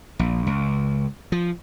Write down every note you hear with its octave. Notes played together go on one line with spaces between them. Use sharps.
A#1
C#2
F3